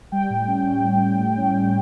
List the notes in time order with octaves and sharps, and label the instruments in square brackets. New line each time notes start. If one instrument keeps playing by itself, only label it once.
[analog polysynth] G3 G5
A2
C#4
C#4
A2
G3
A2
C#4
G3